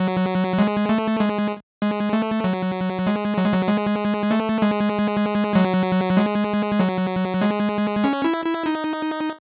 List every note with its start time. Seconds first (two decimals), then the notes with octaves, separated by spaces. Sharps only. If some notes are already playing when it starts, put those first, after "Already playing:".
Already playing: F#3
0.58 G#3
0.89 A3
1.20 G#3
1.82 G#3
2.13 A3
2.44 F#3
3.07 G#3
3.38 F#3
3.45 G#3
3.53 F#3
3.68 G#3
4.31 A3
4.62 G#3
5.55 F#3
6.17 G#3
6.79 F#3
7.41 G#3
8.04 C#4
8.24 E4
8.45 E4
8.66 D#4